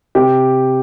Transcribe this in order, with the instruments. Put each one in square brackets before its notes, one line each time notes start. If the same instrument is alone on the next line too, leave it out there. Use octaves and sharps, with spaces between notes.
[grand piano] C3 G4